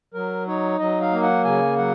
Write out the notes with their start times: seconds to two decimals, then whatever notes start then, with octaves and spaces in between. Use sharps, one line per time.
0.14 F#3 A#4
0.47 D#4 C#5
0.79 F#3 D#5
1.01 F5
1.12 A#3
1.23 F#5
1.44 C#3 G#5
1.77 F#3 F#5